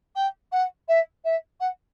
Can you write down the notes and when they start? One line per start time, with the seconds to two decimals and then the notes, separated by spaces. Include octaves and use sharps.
0.15 G5
0.51 F#5
0.88 E5
1.24 E5
1.60 F#5